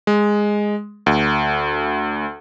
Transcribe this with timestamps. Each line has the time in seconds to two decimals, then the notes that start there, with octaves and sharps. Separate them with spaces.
0.07 G#3
1.06 D2